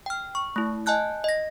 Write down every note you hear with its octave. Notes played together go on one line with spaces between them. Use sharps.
G5 F6
C#6
A3 E4
D#5 G#5 A5 F#6 G6
D#5 A#6